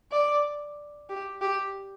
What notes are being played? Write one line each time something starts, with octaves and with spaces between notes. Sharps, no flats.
D5
G4
G4